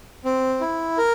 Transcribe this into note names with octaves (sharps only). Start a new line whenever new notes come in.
C4
E4
A#4